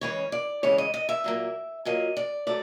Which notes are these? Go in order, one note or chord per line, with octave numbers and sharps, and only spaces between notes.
C#3 E3 G#3 C#4 C#5
D5
C#3 E3 G#3 C#4 C#5
D#5
D#5
E5
A#2 F#3 A#3
A#2 F#3 A#3 D#5
D5
F#3 A3 D5